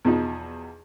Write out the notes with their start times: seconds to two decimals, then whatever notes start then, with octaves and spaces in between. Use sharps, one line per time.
0.05 E2 B2 F3 D#4